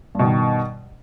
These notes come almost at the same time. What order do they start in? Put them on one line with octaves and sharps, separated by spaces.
G2 B2 D#3